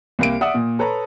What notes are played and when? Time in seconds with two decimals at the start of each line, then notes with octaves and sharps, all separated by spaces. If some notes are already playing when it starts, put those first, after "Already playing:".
0.19 C2 A#3 D7
0.41 D5 E5 F#5 D#6
0.54 A#2
0.79 A4 B4 C#5 A#5